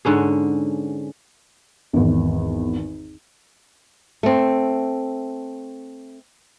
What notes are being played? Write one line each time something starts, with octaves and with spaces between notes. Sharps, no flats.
G#2 D3 C#4 G#4
G#1 E2
A3 C4